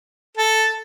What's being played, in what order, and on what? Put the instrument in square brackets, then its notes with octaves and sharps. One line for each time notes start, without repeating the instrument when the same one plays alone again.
[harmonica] A4